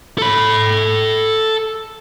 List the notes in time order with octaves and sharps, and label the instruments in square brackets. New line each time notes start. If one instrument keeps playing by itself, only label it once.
[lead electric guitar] A4 B5